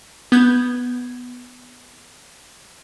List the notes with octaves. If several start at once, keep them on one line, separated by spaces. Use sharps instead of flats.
B3 G6 G#6